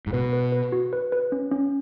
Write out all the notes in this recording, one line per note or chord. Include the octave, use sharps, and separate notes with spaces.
G#2
B2 B4
B4
B4
F#4
B4
B4
C#4
C#4